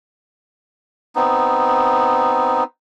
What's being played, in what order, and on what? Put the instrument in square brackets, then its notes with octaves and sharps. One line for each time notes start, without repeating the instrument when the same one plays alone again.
[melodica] B3 C4 D#4